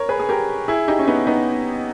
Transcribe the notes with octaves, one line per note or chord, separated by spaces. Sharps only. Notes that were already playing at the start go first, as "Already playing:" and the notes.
Already playing: A#4 C#5
G#4 B4
G#4
G4 A#4
E4 G#4
D#4 G4
C#4
B3 D#4
B3 D#4